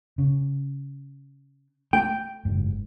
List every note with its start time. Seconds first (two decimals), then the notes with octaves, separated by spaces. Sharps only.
0.18 C#3
1.93 A3 G5
2.45 F#1 G#2